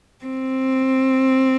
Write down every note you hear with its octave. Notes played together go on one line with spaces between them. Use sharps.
C4